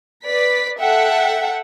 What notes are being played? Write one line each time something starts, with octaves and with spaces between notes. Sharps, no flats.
B4 D5 B6
A4 E5 F#5 G5